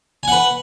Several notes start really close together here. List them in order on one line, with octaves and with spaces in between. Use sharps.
G#5 F#5 B4